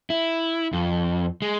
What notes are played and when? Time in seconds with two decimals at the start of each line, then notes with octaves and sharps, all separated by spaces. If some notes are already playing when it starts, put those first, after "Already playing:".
0.10 E4
0.73 F2
1.42 G#3